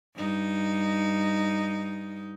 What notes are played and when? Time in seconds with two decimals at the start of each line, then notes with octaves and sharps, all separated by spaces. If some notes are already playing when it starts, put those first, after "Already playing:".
0.16 G2 D#4